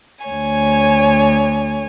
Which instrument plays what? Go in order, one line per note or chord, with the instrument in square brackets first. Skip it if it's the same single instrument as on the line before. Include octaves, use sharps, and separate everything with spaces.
[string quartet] D2 C#5 G#5